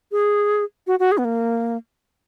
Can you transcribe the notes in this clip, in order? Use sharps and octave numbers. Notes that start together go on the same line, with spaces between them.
G#4
F#4
F#4
G#4
B3
A#3